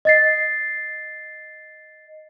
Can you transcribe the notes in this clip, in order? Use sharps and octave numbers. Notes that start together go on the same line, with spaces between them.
D#5 A6 C7